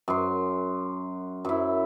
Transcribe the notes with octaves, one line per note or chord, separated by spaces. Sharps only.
F#2 C6
F#2 E4